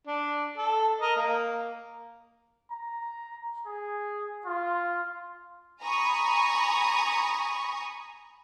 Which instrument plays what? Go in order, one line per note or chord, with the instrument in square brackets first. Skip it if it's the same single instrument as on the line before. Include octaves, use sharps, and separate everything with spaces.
[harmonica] D4
A4
A#4 D#5
A#3
[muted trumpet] A#5
G#4
F4
[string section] G#5 A#5 B5 C#6 D#6